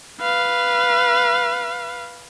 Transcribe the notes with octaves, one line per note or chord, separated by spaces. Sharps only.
B4 F5